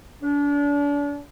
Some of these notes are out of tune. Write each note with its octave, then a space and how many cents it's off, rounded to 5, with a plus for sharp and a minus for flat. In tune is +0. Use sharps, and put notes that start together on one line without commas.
D4 -35